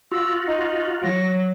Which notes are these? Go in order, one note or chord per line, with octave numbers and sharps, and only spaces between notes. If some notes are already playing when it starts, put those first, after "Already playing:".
F4 F#4 E6
D#4
F#3 A#6